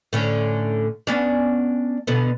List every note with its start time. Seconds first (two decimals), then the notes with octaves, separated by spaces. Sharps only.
0.13 A2 D3 C#4
1.07 B3 C#4 D4
2.07 B2 D3 B3